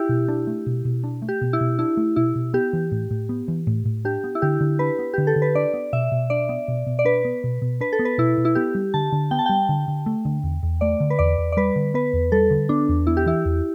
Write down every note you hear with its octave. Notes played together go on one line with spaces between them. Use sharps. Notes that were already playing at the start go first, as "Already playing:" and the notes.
Already playing: E4 G4
B2
D4
A3
B2
B2
D4
A3
G4
B2
E4
B2
D4 E4
A3
B2 E4
B2
B3 G4
E3
A2
A2
B3
E3
A2
A2
D4 G4
B3
E4
D3 G4
D3
D4 B4
B3
D3 G4
A4
D3
B4
D4 D5
B3
B2 E5
B2
D4 D5
B3
B2
B2
D5
D4 B4
B3
B2
B2
D4 B4
A4
B3
B4
B2 E4
B2
E4
B3 G4
G3
D3 A5
D3
B3 G5
A5
G3 G5
D3
D3
A3
D3
E2
E2
A3 D5
D3
B4
E2 D5
E2
D5
G3 B4
D3
B3 B4
E2
G3 A4
D3
B3 D4
E2
B3 E4
G4
E3 E4
E2